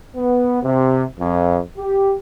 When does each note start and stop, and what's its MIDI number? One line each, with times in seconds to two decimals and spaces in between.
0.16 0.61 59
0.63 1.03 48
1.19 1.59 41
1.78 2.15 67